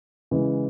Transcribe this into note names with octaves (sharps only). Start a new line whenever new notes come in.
C#3 E3 G#3